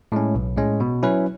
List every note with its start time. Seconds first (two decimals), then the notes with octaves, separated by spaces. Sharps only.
0.12 A2 G#3 C#4
0.35 B1
0.56 A2 G#3 C#4
0.80 B2
1.03 F#3 C#4 E4 B4